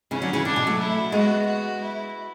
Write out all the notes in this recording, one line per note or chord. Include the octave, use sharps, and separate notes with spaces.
C#3 E3 C#4
D3 F#3
C#3 E3
C#3 D4
B2
F#3 A3
E4
G#3 B3 F#4
F#4
E4